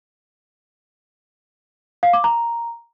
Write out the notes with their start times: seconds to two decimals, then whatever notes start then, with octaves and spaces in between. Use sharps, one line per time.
2.03 F5
2.13 D6
2.24 A#5